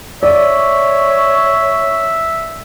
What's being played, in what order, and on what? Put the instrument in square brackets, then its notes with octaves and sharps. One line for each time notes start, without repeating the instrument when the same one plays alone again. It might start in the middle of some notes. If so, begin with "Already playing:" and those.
[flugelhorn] C#5 [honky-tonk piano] D5 [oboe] E5